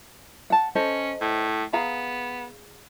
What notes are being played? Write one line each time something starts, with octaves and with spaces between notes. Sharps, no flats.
F#5 A5
C#4 A4 C5 D#5
A2
B3 G#4 F5 A#5